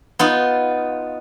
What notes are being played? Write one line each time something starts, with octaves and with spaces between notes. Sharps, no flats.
B3 D#4 F4